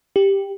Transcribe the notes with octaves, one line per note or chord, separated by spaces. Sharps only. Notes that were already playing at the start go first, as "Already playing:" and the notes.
G4